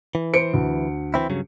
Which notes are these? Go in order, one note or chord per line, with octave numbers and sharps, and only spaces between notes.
E3
C5 C#7 D7
D2
E3 C4 E4
G2 C#3 F#3